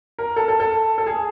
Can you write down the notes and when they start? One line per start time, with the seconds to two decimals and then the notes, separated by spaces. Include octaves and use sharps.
0.19 A#4
0.36 A4
0.48 A4
0.60 A4
0.98 A4
1.06 G#4